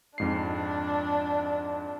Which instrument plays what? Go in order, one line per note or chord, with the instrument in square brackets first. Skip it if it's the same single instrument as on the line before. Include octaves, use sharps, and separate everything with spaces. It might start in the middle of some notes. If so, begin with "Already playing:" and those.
[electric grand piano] F2 G#2 C7 [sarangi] D4